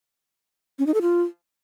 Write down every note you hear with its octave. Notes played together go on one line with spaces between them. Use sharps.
C#4
D#4
A4
F4